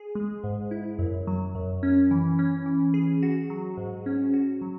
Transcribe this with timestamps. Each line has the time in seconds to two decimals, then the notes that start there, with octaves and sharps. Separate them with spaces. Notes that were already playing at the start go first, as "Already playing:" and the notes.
Already playing: G#4
0.15 G#3
0.44 G#2
0.71 E4
0.99 F#2
1.27 F#3
1.55 F#2
1.83 C#4
2.11 E3
2.39 C#4
2.66 E3
2.94 G#4
3.23 F#4
3.50 F#3
3.77 G#2
4.06 C#4
4.34 F#4
4.61 F#3